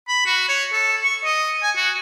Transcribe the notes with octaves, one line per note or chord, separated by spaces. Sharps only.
B5
F#4
C#5
A4
C#6
D#5
G#5
F#4